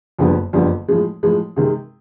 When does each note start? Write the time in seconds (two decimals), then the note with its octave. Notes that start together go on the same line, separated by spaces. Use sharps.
0.19 F#1 F2 D3 G3 B3
0.53 F#1 F2 D3 G3 B3
0.88 A2 F3 G#3
1.23 A2 F3 G#3
1.56 C3 D#3 G#3